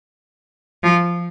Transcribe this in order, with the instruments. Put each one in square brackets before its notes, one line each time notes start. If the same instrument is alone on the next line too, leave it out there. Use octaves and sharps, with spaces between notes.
[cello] F3